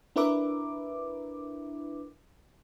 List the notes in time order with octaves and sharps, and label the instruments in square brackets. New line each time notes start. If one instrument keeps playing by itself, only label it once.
[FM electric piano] D4 E4 A#4 B4 E5 D6